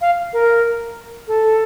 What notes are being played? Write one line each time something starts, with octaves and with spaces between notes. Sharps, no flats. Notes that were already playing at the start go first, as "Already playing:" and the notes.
F5
A#4
A4